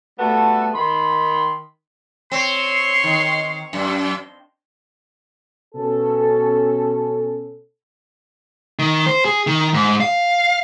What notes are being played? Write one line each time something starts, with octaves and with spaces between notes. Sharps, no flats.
G3 A3 B3 F#4 A4
D#3 B5 C6
C4 C#5 C6
D#3
F#2
B2 C#4 A4
D#3
C5
G#4
D#3
G#2
F5